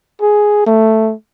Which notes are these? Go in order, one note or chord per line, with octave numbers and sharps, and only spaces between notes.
G#4
A3